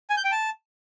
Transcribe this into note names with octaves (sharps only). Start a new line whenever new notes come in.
G#5
G6
G5
A5